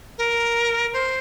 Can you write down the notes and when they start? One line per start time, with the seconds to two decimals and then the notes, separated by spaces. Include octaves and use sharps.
0.18 A#4
0.93 C5